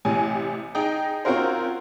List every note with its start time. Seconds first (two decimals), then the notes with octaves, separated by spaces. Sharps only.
0.05 A1 C3 G#5
0.75 D#4 G#4 D#5 G5
1.25 C4 C#4 F4 F#4 A#4 C5